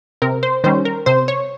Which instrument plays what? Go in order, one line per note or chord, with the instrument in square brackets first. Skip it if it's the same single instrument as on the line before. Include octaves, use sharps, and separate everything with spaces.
[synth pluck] C3 A#4
C5
D#3 G3 C#4 C5
A#4
C3 C5
C#5